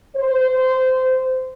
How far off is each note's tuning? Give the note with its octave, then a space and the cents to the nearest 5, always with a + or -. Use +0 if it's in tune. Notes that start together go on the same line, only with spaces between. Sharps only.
C5 -20